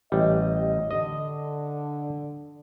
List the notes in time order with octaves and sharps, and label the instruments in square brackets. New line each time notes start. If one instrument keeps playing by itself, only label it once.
[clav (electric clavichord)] A1 G3 [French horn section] D#5
[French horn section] D3 [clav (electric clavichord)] D#5